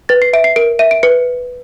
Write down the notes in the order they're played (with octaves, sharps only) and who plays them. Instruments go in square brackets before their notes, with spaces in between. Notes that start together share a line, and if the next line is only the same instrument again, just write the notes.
[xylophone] B4 A6
C7
E5 D7
C7
A#4 D7
E5 D#7
D7
B4 C#7